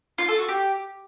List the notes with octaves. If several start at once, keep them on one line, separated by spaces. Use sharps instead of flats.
F4
A4
F#4
G4